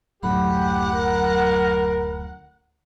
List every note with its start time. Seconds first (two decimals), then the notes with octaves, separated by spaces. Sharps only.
0.23 D1 F#2 A2 G4 F#5 B5
0.93 A#4